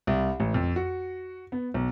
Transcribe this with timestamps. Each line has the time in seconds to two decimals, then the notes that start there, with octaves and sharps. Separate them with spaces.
0.07 C2
0.40 A1
0.54 F2
0.76 F#4
1.52 B3
1.74 B1